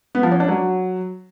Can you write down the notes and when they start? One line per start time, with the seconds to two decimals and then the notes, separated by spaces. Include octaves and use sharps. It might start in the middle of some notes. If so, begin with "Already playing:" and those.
0.15 B3
0.23 F3
0.32 C#4
0.40 D4
0.48 F#3